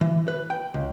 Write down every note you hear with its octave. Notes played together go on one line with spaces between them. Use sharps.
E3
B4
G5
C#2